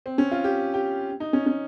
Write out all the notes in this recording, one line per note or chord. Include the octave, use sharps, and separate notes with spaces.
C4
C#4
F4
G4
G4
D#4
C#4
C#4